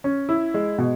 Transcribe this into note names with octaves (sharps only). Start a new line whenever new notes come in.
C#4
E4
G#3
B2